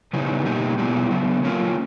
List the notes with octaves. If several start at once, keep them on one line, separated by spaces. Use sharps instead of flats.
C#3 E3 G3 B3 D#4
B2 G3 A#3 D#4 G4
B2 G3 B3 E4 G4
C#3 F#3 B3
F#3 A#3 C#4 F4